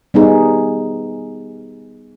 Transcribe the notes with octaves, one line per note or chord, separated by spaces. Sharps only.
G3 B3 D#4 G#4